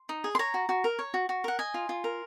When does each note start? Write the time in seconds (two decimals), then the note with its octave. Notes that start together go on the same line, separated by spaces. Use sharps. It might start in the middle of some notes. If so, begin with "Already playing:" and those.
Already playing: C6
0.09 D#4
0.24 G#4
0.35 C6
0.39 C#5 A#5
0.54 F#4
0.69 F#4
0.84 A#4
0.99 C#5
1.14 F#4
1.29 F#4
1.44 A#4 F#5
1.59 D#5 G#5
1.74 F4
1.89 F4
2.04 A#4